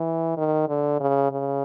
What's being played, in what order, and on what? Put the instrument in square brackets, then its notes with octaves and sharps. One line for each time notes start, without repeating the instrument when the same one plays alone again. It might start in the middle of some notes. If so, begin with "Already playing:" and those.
Already playing: [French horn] E3
D#3
D3
C#3
C#3